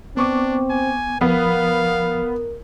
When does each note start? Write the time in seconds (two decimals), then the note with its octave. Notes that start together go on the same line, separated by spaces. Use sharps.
0.17 B3 C4 D4 C#6 D6
0.70 G#5
1.21 F3 B3 A#4 F5